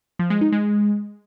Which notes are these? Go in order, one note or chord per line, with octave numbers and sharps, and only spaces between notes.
F3
G#3
D#4
G#3